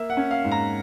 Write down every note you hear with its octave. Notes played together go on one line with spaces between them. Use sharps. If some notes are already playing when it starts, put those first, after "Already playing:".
Already playing: A#3 E5
F#5
C#4
F5
G#2
A#5